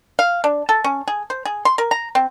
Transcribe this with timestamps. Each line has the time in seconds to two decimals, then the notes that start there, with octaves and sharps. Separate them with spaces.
0.19 F5
0.44 D4
0.69 A4
0.84 C#4
1.08 G#4
1.30 C5
1.45 G#4
1.65 C6
1.78 A#4
1.91 A#5
2.15 C4